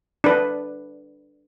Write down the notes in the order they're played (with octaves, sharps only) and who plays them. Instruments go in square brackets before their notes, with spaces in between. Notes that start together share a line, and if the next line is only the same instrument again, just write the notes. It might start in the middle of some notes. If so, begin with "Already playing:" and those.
[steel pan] D4 B4